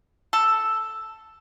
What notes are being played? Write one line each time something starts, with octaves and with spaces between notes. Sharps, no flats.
A4